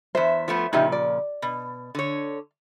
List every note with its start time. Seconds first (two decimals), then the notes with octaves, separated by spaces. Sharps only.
0.15 E2 C5 E5
0.48 F3 A3 B3
0.73 A#2 C#3 F3 D#4 G4 E5
0.92 D5
1.42 B2
1.95 D3 C#5